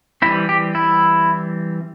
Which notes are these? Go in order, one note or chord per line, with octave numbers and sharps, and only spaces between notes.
E3 G3 C4 E4
G4
E4